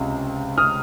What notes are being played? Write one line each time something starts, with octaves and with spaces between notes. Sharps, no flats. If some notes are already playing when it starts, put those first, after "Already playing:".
Already playing: C#2 C3
D#6 F6